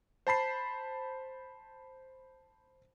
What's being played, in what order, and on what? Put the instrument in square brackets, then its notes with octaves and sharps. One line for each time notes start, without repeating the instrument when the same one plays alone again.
[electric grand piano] C5 A5 B5 C7